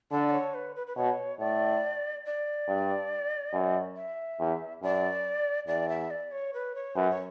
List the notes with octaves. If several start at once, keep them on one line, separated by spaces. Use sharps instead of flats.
D3 D5
D5
C#5
B4
B4
B4
B2 C#5
A2 D5
D5
G2
F#2
E5
E2
F#2 D5
E2 D5
E5
D5
C#5
B4
C#5
F#2 B4
C#5